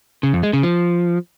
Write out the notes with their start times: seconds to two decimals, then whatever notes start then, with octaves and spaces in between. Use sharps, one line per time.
0.23 C#3
0.33 F2
0.43 G#3
0.53 C#3
0.63 F3